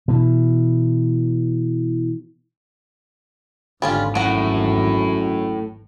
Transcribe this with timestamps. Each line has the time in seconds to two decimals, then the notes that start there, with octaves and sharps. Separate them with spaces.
0.08 B2 E3
3.82 G#1 E2 D3 G3 C#4 F4
4.15 F#2 A2 F#4 F#5